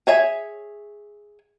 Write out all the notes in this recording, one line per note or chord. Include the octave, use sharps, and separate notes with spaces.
G#4 C#5 E5 G#5